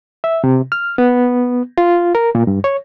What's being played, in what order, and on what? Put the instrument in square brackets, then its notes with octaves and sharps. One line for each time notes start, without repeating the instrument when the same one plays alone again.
[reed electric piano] E5
C3
F6
B3
F4
A#4
A#2
G2
C#5